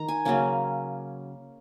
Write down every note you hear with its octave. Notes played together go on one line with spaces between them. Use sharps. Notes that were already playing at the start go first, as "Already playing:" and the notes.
Already playing: D#3 A#5
G#5
C#3 F#3 A#3 C#4